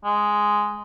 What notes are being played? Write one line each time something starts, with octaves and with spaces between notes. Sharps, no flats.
G#3